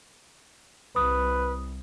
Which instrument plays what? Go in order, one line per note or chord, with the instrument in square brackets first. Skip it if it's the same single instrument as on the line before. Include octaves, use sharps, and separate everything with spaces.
[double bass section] C2 [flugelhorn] B4 [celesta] D#6